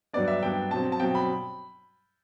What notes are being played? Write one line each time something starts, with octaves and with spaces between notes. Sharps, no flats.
G2 F#3 B3 D4 D5
E5
G2 F#3 B3 D4 G5
B2 F#3 C4 A5
A5
B2 F#3 C4 G5
B5